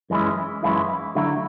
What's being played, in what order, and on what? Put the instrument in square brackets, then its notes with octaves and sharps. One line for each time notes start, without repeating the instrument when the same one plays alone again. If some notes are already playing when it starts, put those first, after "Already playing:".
[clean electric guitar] F#2 E3 G#3 C#4 E4
F#2 E3 G#3 C#4 E4
D3 F#3 A3 E4